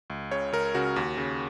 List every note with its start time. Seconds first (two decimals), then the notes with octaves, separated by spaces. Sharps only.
0.10 C#2
0.31 C#3 C#5
0.52 C#2 A#4
0.75 C#3 F#4
0.96 D#2
1.17 C#3